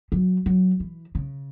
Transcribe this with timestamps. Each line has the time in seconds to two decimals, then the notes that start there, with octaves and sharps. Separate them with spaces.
0.12 F#3
0.46 F#3
0.80 E3
1.15 C#3